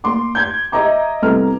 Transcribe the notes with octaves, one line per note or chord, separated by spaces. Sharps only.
A#3 C6 D6
G6 G#6
D#5 E5 A#5 D6
C2 B3 A4 A#5 F6